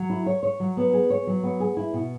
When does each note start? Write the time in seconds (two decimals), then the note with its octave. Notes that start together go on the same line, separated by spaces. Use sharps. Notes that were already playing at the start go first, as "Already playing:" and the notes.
Already playing: F#3
0.10 E4
0.26 C#5
0.43 C#5
0.60 F#3
0.77 B3
0.93 G#4
1.10 C#5
1.27 F#3
1.43 B3
1.60 G#4
1.77 E4
1.93 B2